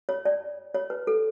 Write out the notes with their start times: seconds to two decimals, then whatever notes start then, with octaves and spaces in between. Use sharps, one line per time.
0.09 C#5
0.25 D5
0.74 C#5
0.90 B4
1.07 A4